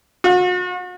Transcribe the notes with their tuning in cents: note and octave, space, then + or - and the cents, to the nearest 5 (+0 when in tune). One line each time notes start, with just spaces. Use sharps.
F#4 -40